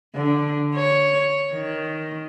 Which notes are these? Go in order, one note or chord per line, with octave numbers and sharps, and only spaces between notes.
D3
C#5
D#3